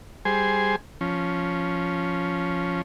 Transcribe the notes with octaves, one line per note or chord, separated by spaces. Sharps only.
G3 G#4 C5 G#5
F3 C#4